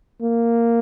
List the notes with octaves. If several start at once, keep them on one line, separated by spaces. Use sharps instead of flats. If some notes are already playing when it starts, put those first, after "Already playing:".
A#3